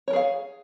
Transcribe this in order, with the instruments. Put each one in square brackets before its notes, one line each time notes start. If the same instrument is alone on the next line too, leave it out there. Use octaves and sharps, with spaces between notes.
[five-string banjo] C#5
A#4
G#4
F5